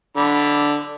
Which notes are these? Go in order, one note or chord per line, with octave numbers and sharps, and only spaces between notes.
D3 B5